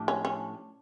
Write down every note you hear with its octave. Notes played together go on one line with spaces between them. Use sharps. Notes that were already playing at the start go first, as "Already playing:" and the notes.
Already playing: A2 F3 A3 D4 G4
C#4
C#4